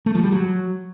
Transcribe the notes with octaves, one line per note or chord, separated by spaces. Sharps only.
A3
F3
G3
F#3